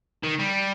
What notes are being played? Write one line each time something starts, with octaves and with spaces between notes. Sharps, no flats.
D#3
G3